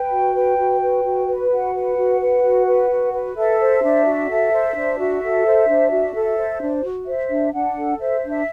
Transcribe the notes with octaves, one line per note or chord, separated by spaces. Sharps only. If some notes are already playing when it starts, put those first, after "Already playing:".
Already playing: B4 G5
F#4
B4
F#4
B4
F#4
B4
F#4 F#5
B4
F#4
B4
F#4
B4
F#4
B4
A4 E5
C5
D4
F#4
A4
C5
D4
F#4
A4
C5
D4
F#4
A4
C5
D4
F#4
C5 E5
D4
D4 F#5
A4
C5 E5
D4
E5